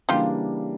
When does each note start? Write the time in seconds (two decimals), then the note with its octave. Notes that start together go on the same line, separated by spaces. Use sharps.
0.09 C#3 E3 G3 A#3 D4 F4 G4